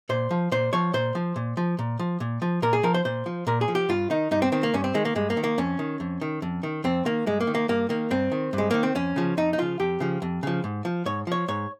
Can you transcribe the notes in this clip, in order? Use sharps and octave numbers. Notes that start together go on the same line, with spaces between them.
A#2 C5
F3
A#2 C5
F3 C#5
A#2 C5
F3
A#2
F3
A#2
F3
A#2
F3
A#2 A#4
G#4
F3 A#4
C5
A#2 C5
F3
A#2 A#4
G#4
F3
G4
G2 F4
D#3 D#4
G2 D#4
C4
D#3 C4
A#3
G2 C#4
C4
D#3 G#3
A#3
G2 G#3
A#3
D#3
A#3
F2 C#4
D#3
F2
D#3
F2
D#3
F2 C4
D#3 A#3
G2 G#3
A#3
D#3
A#3
G2 A#3
D#3 A#3
G2 C4
D#3
G2
G#3
D#3 A#3
C4
F2 C#4
C#3 F3
F2 D#4
D#4
C#3 F3 F4
F2 G4
C#3 F3
F2
C#3 F3
G#2
F3
G#2 C#5
F3 C#5
G#2 C#5